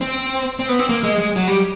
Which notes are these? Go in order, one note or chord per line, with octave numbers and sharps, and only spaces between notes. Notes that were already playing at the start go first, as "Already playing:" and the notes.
C4
C4
B3
C4
A#3
G#3
G#3
F#3
G3